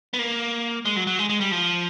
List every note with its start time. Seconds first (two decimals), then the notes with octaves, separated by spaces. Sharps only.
0.14 B3
0.19 A#3
0.85 G#3
0.96 F#3
1.07 F#3
1.19 G#3
1.29 G#3
1.41 G3
1.51 F3